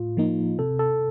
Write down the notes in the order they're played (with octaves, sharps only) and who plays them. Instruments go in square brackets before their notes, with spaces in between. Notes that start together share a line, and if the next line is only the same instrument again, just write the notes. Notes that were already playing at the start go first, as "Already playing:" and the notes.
Already playing: [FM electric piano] A2 [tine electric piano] F4
[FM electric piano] F3 A#3 D#4
[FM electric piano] C3 [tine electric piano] A4
[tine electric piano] A4